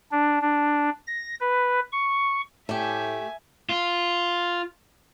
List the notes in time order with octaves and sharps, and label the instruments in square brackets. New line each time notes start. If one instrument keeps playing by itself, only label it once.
[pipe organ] D4
D4
A#6
B4
C#6
[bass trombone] A2 [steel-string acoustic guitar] A3 G4 [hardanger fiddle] E5 G#5
[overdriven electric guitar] F4